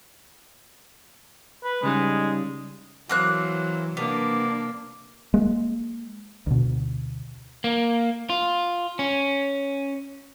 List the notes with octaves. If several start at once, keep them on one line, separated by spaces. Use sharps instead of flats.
B4
C#3 G3 G#3 D#4
E3 F#3 A#3 C4 F#6
C3 A#3 B3 D4 D5
G#3 A#3
D2 B2
A#3
F4
C#4